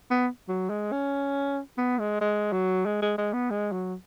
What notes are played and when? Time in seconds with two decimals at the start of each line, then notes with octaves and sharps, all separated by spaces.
0.11 B3
0.48 F#3
0.70 G#3
0.92 C#4
1.78 B3
1.99 G#3
2.21 G#3
2.53 F#3
2.86 G#3
3.02 G#3
3.18 G#3
3.33 B3
3.51 G#3
3.72 F#3